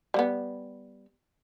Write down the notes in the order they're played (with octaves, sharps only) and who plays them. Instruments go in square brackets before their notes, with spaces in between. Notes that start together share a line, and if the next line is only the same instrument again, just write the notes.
[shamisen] G3 A#3 B3